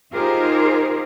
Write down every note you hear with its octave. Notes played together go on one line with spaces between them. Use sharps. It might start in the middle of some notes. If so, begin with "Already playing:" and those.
D#4 F4 G4 G#4 A#4 C5